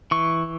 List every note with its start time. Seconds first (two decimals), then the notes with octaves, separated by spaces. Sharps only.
0.11 E3 C#6